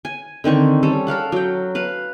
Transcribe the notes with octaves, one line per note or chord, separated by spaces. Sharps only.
G#5
D3 D#3 C4 C#6
G3 C#4 A4
A4 A#4 F5 F#5
F#3 G5
B4 F5